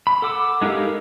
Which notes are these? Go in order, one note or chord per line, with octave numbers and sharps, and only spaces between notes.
B5
A4 F#5 D6 E6
G#3 D#4 G4 A#4 F5